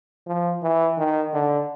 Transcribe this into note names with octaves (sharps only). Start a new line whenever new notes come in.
F3
E3
D#3
D3